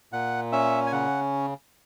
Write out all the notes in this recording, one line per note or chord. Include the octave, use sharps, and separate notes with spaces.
A#2 F#5
C#4 E5
G#5
C#3 F#5